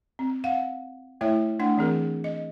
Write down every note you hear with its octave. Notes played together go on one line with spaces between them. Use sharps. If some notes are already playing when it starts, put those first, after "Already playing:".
C4
F5 F#5
A3 E4 C#5 E5
A3 D4 F#5
E3 C4 G#4 A#4
D#5